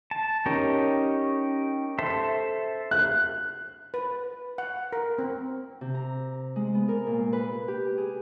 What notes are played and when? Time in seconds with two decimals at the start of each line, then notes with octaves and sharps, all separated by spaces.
0.11 A5
0.46 C#4 D#4 G4 A#4
1.98 A4 C5 E5
2.91 F#6
3.94 B4
4.58 F#5
4.92 A#4
5.18 C4
5.81 C3
5.95 A#5
6.56 G#3
6.75 B3
6.88 A#4
7.07 A#2
7.33 B4
7.68 G4
7.98 G#4